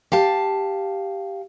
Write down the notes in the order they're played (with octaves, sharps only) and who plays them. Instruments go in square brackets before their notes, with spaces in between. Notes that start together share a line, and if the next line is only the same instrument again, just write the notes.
[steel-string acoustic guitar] G4 F5 A5